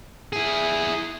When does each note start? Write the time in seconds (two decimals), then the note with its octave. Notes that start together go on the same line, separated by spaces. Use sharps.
0.33 E4 G#4